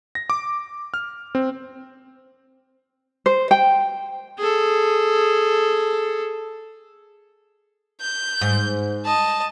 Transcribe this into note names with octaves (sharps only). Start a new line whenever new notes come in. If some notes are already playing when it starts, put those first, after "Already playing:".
A#6
D6
F6
C4
C5
G5
G#4 A4
G6
G#2
D#5 A5